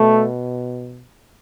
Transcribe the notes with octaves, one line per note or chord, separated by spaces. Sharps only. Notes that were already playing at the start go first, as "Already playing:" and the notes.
Already playing: B2 A3